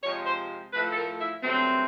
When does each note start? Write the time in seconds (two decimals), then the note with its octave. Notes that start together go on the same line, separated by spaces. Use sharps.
0.03 C3 F3 G#3 C#5
0.26 C5
0.73 A2 F3 A3 B4
0.92 A4
0.96 A#4
1.19 E4
1.43 G2 D3 F#3 A3 C4